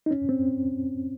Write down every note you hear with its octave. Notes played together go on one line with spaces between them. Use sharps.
D#4
C#4
C4